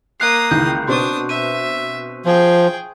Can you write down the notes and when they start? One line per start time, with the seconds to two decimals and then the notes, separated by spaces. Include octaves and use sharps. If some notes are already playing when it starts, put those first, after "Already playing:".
0.20 A#3 D#6 F#6 C7
0.51 C#2 D#3 E3 G6
0.88 B2 B3 C4 D4 C6 C#6 D#6
1.29 E5 D#7
2.26 F3 G#4 G5